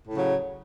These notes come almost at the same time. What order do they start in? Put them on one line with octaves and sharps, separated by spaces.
A2 C#3 F#3